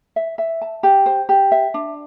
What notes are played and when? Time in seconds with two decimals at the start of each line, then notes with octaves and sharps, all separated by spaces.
0.16 E5
0.38 E5
0.62 A5
0.83 G4
1.06 C5
1.29 G4
1.52 E5
1.74 D4